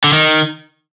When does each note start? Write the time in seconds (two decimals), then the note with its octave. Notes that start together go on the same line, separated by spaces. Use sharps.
0.04 D3
0.13 D#3